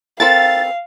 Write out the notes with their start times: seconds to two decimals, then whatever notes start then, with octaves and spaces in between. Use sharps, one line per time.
0.20 C4 A4 A#4 F5 A6